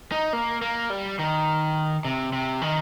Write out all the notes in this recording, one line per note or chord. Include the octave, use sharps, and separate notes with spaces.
D#4
A#3
A#3
G3
D#3
C3
C3
D#3